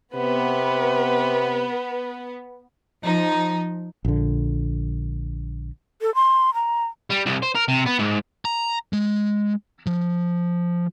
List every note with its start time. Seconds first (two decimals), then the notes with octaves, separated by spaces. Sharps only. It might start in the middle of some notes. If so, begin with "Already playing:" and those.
0.15 C3 B3 B4
3.03 F3 D#4
4.05 A#1 D3
6.02 A4
6.15 C6
6.54 A#5
7.10 G3
7.26 C2
7.43 C5
7.55 A#4
7.68 C3
7.86 B3
7.99 G#2
8.45 A#5
8.93 G#3
9.87 F3